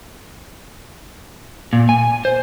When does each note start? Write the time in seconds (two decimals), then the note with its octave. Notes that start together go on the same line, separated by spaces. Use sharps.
1.73 A#2
1.89 G#5
2.25 C5